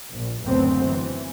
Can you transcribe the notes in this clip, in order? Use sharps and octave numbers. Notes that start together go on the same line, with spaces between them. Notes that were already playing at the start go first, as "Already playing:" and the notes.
A#1
F#1 D2 C#3 B3 C4
E3